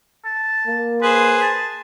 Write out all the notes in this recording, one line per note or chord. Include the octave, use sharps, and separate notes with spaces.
A5
A#3
G#4 B4 C5
A5